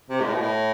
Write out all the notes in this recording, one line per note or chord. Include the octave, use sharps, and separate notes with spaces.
C3
G#2
A2
B2
A2